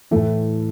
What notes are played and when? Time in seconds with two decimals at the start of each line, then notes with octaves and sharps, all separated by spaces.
0.11 A2 E3 A3